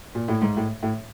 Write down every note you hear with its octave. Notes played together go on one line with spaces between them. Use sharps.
A#2
A2
G#2
A2
A2